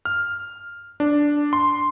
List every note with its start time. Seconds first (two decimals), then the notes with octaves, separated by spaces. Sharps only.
0.05 F6
1.00 D4
1.53 C6